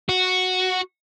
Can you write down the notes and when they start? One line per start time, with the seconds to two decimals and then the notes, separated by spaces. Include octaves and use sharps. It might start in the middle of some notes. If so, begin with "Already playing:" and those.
0.09 F#4